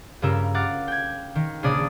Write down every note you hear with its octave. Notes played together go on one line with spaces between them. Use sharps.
G2 C#3 G3 F4 A#4 E6
F5 F#5 D6 A6
G5 G#6
D#3
A#1 C#3 D4 D5 D#6 A6